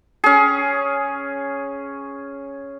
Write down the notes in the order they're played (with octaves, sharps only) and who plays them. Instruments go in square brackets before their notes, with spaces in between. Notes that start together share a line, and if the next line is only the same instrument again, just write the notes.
[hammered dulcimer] C#4 G#4